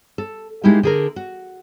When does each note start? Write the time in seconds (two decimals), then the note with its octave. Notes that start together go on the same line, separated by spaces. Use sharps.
0.18 A4
0.64 G#3 A#3 D#4 E4 G4
0.83 D3 G#4 A#4
1.16 F#4